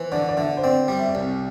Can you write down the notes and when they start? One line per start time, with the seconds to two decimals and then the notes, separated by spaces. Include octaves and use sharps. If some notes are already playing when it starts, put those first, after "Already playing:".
Already playing: E3 C5
0.12 D3 D5
0.29 D5
0.37 D3 E5
0.57 C5
0.63 C4 D5
0.88 G3 D5
0.99 E5
1.09 D5
1.15 C2